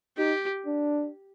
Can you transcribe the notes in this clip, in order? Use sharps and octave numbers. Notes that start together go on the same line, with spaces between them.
D#4 G4
D4